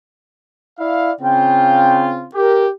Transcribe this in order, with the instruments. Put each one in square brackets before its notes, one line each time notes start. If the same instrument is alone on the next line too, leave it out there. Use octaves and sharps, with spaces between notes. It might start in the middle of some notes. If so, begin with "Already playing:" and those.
[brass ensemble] E4 D5 F5
[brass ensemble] C#3 C4 F4 [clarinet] G5
[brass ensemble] G4 [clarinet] A#4